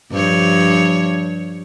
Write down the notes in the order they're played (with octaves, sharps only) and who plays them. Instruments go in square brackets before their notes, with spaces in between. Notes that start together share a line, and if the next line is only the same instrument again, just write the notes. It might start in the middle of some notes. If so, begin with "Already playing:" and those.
[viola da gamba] G2 F3 C#5